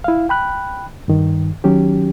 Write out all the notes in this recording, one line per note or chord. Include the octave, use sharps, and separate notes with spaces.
E4 F5
G5 B5 F#6
G2 D#3
D#3 F#3 C#4 G4